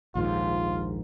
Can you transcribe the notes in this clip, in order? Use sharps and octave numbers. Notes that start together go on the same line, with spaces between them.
A#1 D#2 G#2 F4